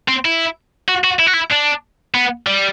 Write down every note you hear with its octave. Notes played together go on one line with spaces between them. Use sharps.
C4
E4
F#4
F#4
E4
F#4
E4
D4
B3
G3